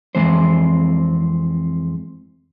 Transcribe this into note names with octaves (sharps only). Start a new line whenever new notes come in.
F2 E3 G#3 C4 C5